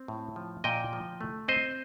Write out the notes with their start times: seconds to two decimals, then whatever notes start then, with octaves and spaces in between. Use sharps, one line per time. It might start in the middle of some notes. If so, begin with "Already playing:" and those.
Already playing: C4
0.08 A2
0.36 F3
0.64 A#2 D#5 G5
0.93 F3
1.21 A3
1.48 C4 C5 D#5